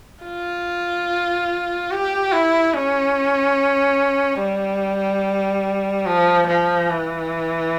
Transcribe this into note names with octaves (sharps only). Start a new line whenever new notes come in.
F4
G4
E4
C#4
G3
F3
F3
E3